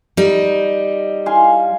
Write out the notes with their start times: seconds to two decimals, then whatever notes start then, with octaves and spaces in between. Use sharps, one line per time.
0.17 G3 D#4
1.26 F5 G#5 C6